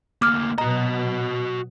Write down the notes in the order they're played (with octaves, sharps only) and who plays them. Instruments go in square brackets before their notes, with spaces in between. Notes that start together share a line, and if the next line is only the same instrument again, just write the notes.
[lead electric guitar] D2 A#3 [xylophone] D6 F6
[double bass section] B2 F#3 [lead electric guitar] F#4 D#5 [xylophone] A#5